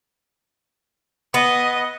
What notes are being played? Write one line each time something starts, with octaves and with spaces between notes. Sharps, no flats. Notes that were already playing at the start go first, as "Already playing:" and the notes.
B3 D#5